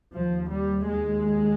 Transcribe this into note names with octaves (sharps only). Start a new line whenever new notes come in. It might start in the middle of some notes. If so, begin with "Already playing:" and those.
D#2 F3
G3
G#3